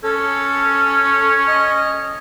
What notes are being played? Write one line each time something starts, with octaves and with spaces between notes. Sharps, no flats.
C#4 A4
D#5